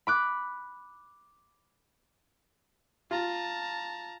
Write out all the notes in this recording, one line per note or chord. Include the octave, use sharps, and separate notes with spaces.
B5 D6 F#6
F4 A5 A#5